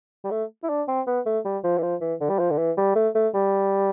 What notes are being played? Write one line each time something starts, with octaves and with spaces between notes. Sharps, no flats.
G3
A3
E4
D4
C4
B3
A3
G3
F3
E3
F3
E3
D3
G3
F3
D3
E3
G3
A3
A3
G3